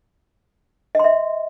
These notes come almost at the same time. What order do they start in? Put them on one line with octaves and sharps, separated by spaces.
D#5 C6 E5